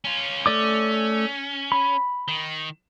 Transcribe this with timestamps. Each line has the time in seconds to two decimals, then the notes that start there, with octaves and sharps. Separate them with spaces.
0.04 C#4 F4
0.46 A3 C#4 D5 D6
1.72 B5
2.28 D#3